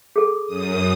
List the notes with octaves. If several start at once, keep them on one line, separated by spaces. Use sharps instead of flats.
G#4 A4
F#2 D#6